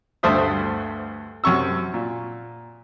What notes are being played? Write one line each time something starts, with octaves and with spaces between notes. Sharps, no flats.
D2 G2 A3 C5 E5 D#6
F#2 C3 C#6 E6
A#2